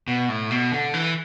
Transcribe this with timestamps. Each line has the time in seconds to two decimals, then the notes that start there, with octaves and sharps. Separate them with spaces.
0.08 B2
0.29 A2
0.51 B2
0.72 D3
0.94 E3